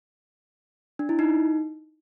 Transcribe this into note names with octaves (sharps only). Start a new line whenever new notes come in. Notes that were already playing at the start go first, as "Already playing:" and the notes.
D4
E4
D#4